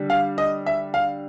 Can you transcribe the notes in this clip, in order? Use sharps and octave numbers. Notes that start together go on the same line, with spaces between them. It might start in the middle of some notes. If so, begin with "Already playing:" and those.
Already playing: D3 G3
F5
D#5
E5
F5